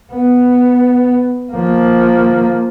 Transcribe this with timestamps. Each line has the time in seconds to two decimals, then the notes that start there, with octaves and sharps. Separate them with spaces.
0.12 B3
1.52 F3 A#3